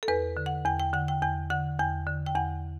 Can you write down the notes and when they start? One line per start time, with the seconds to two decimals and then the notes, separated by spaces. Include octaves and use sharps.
0.03 A4
0.08 E2 B4
0.37 D3
0.46 F#5
0.65 E2 G5
0.80 G5
0.93 D3 F#5
1.08 G5
1.22 E2 G5
1.50 D3 F#5
1.79 E2 G5
2.07 D3
2.26 G5
2.35 E2 F#5